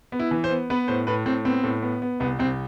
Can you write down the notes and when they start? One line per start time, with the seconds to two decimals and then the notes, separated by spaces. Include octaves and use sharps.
0.12 B3
0.20 E4
0.31 E3
0.44 C5
0.50 B3
0.70 B3 B4
0.88 A2 C5
1.07 A2 B4
1.26 A2 C4
1.45 B3 C4
1.64 A2
1.83 B3
2.02 B3
2.20 C2 B3
2.39 C2 C4